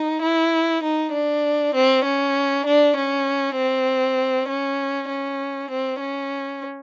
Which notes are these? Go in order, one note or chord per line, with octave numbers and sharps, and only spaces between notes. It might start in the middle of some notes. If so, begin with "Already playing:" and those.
Already playing: D#4
E4
D#4
D4
C4
C#4
D4
C#4
C4
C#4
C#4
C4
C#4